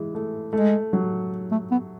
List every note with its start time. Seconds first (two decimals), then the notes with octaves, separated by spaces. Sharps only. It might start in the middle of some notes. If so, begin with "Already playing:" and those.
Already playing: E3 G#3
0.15 A3
0.53 G#3 A3
0.93 F#3
1.51 A3
1.71 B3